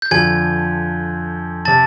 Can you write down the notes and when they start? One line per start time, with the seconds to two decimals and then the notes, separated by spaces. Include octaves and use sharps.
0.02 G6
0.11 F2 D3 F3 G#5 G#6
1.65 C3 A5 A6